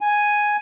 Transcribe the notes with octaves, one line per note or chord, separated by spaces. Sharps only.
G#5